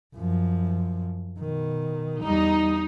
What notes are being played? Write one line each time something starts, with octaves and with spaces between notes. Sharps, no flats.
F#2 F3
B2 D#3
E2 G3 D#4